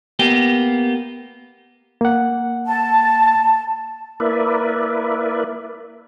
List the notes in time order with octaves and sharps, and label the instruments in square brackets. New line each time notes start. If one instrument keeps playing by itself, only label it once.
[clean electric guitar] A#3 B3 G4
[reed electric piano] A#3 F#5
[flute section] A5
[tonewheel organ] A#3 E4 A#4 B4 D5 E5